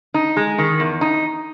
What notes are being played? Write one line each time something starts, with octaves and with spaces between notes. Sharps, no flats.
D#4
G#3
D#3
E2
D#4